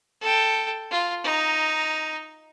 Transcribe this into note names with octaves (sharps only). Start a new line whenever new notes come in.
A4 G5
F4
D#4 A#5